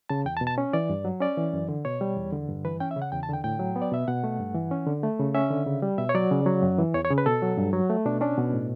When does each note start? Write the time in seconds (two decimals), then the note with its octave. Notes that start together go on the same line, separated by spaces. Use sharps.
0.09 C#3 A5
0.25 E2 G5
0.37 A5
0.41 B2
0.47 A5
0.58 C#4
0.73 E3 D5
0.90 G2
1.05 F#3
1.21 C#4 D5
1.37 E3
1.53 F#2
1.69 D3
1.85 B2 C#5
2.01 G3
2.16 E2
2.33 D3
2.48 G2
2.64 E3 B4
2.80 C#4 G5
2.91 E5
2.96 C#3
3.02 F#5
3.12 E2 G5
3.23 A5
3.29 D3 G5
3.44 A2 G5
3.60 F#3
3.76 B3
3.82 D5
3.92 B2 E5
4.08 B2 F#5
4.24 A3
4.39 G2
4.55 E3
4.71 C#4
4.87 D3
5.03 A3
5.19 C#3
5.35 C#4 E5
5.51 D3
5.66 C#3
5.82 G3
5.98 B2 E5
6.09 C#5
6.15 F#3 D5
6.31 C#3
6.46 F#3
6.63 F#2
6.79 E3
6.94 E2 C#5
7.05 C#5
7.10 C#3
7.18 B4
7.26 B2 A4
7.42 F#3
7.57 G2
7.73 F#3
7.90 A3
8.06 B2 D4
8.21 C#4 D4
8.38 B2
8.54 A2